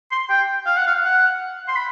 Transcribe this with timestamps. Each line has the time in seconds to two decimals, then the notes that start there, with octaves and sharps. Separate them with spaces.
0.11 C6
0.30 G5
0.66 F5
0.77 F#5
0.87 F5
1.04 F#5
1.68 C6
1.76 B5